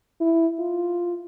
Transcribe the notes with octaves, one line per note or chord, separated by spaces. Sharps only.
E4
F4